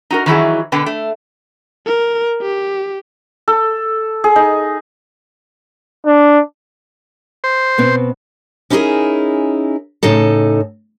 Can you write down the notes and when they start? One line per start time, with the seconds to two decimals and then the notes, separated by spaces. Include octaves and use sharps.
0.10 D#4 F#4 A#4
0.26 D#3 E3 F#3 E4 F#4 G#4
0.72 B2 D3 B4 G5
0.86 A3
1.86 A#4
2.41 G4
3.48 A4
4.24 G#4
4.36 D#4
6.06 D4
7.44 C5
7.78 B2 B3 C4
8.70 C#4 D#4 E4 G4 G#4 A#4
10.03 A2 C#3 D#4 A4